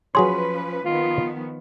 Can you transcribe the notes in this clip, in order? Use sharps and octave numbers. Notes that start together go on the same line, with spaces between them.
F3 F#3 C#4 G#4 B4 C#5 C6
D#3 F3 B3 F4